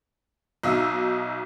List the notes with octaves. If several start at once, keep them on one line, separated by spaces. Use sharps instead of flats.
B1 B2 D#4 E5 F5 E6